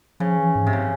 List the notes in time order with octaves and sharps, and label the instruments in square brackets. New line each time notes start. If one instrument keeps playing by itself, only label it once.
[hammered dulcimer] C#3 [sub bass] F3
[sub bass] E3
G#2
[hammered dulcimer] C3
C#3